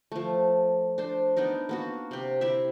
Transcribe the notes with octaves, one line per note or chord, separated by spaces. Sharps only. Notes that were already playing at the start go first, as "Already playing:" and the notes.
F3 A3
D4 C5
B3 D4 D#4 A#4
A#3 B3 F#4
C3 G4
E4 G4 E5